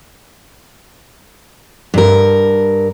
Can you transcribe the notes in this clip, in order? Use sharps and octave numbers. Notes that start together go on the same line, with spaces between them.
G2 A#4